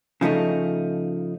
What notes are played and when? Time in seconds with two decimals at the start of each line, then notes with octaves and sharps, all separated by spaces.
0.21 C#3 F3 A3 D#4